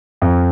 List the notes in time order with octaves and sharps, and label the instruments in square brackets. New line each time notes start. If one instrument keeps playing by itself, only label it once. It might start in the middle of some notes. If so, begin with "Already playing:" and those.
[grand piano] F2